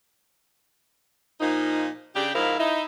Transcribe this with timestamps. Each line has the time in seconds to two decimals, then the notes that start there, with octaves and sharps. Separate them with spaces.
1.40 A#2 F3 A#3 D#4
2.16 C#3 D4 G4
2.35 G#2 F3 E4 A#4 F5
2.59 D#4 E4